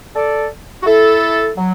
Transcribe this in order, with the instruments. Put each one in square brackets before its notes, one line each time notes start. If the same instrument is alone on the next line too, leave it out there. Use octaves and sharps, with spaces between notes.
[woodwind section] A4 D5
F#4
E4 A4
F#3